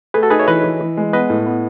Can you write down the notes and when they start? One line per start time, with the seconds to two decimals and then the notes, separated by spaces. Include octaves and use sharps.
0.14 A3 G#4 B4
0.23 F#4 A4
0.30 D#4 G#4 B4
0.39 C#5 E5
0.48 E3 B4 D#5
0.64 E3
0.80 E3
0.97 G#3
1.13 B3 B4 D#5
1.30 A2
1.46 B3